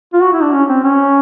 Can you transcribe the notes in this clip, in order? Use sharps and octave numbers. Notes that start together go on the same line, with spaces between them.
F4
F#4
E4
D4
C#4
C4
C#4